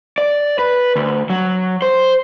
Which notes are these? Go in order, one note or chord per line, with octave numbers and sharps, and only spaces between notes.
D5
B4
D2
F#3
C5